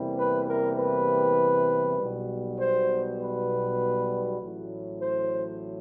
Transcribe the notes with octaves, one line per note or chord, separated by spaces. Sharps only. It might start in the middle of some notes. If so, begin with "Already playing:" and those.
Already playing: E2 C3 E3 G3 A#3
B4
A#4
B4
B1 B2 G3
C5
B4
A1 A2 F#3
C5